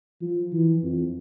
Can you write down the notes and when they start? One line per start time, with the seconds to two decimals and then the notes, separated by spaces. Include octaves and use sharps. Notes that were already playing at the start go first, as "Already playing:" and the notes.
0.21 F3
0.53 E3
0.83 F2